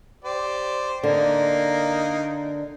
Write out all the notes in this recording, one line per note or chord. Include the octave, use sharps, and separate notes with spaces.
G4 C5 D5
D3 A#3 D#4